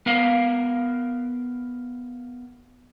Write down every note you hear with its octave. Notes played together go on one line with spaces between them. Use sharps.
B3 A#4 F5